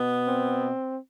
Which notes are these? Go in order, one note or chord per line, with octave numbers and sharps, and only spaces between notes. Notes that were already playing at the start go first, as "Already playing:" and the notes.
Already playing: B2 B3
C4